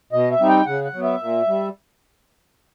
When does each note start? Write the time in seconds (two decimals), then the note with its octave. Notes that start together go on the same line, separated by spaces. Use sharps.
0.13 B2 D#5
0.31 E5
0.40 G3 C4 D#4
0.48 G5
0.66 C#3 F#5
0.84 F#5
0.94 F#3 B3
1.03 E5
1.20 A#2
1.47 G3